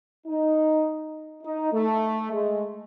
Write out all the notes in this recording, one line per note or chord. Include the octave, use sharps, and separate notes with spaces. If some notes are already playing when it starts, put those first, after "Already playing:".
D#4
D#4
A3
G#3